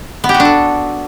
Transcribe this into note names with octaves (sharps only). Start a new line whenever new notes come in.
B3
G4
F#4
D4
A4